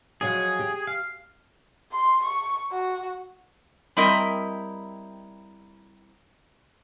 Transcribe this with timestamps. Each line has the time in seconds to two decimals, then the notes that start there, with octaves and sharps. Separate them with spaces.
0.21 F3 F#3 G#3 G#4
0.59 G4
0.87 F5
1.92 C6
2.24 C#6
2.72 F#4
3.97 G3 C4 E4 A#4 D#5 E5